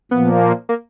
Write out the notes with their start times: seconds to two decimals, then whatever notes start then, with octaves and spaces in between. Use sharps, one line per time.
0.11 A#2 F3 A#3 B3
0.69 A#3